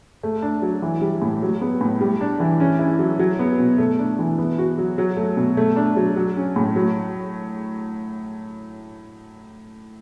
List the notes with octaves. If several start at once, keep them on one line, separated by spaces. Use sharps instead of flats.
A3
D4
F#3
E3
G3
A2
F#3
B3
A2
G3
D4
E3
C#4
E4
F#3
F#3
B3
B2
A3
D4
E3
B3
F#4
F#3
F#3
A3
B2
A3
D4
F#3
F#3
C#4
A2
F#3